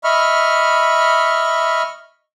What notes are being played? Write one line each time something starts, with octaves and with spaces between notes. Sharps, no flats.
D#5 E5 B5 C#6 F6